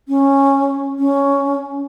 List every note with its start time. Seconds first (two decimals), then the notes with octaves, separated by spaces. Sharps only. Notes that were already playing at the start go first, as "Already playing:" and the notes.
0.09 C#4
0.99 C#4